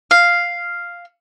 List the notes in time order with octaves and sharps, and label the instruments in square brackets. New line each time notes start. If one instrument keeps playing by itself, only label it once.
[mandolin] F5